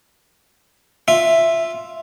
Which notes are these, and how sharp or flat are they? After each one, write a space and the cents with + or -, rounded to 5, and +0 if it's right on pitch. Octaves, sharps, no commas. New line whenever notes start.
F4 +0 E5 +5